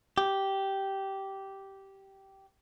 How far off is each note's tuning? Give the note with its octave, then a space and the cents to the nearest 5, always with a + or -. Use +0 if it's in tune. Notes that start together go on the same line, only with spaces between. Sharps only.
G4 -10